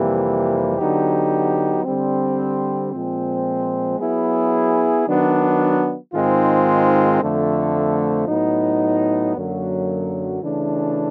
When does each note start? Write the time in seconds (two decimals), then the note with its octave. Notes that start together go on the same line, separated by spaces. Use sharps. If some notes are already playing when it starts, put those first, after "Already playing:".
Already playing: F2 C3 E3 G3 A#3
0.79 D3 F#3 B3 D#4 G4
1.85 D3 G3 C4
2.92 A#2 F3 G#3 C4
3.99 F#3 B3 E4 G#4
5.07 D#3 F#3 B3 D4
6.13 G#2 D#3 G#3 C4 F4
7.21 F2 D3 F3 A3
8.27 A2 F#3 B3 D#4
9.35 F#2 D3 F#3 A#3
10.41 C#3 E3 A3 D4